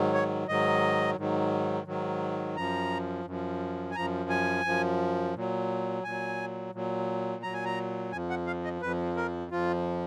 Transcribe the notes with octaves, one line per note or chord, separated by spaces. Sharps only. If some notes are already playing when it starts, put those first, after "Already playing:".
Already playing: G#2 D#3 F#3
C#5
G#2 D#3 F#3 D#5
G#2 D#3 F#3
G#2 D#3 F#3
F#2 F3 A#5
F#2 F3
G#5
F#2 F3 A#5
G#5
F#2 F3
A#2 F#3
A#2 F#3 G#5
A#2 F#3
A#2 F#3 A#5
G#5
A#5
F2 F3 G#5
F#5
F5
D#5
F2 F3 B4
A#4
F2 F3 F4